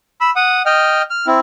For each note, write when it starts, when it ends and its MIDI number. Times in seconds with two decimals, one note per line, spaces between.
0.21 0.30 83
0.21 0.30 88
0.36 0.62 78
0.36 0.62 87
0.66 1.02 75
0.66 1.02 79
0.66 1.02 89
1.10 1.26 89
1.27 1.40 60
1.27 1.40 64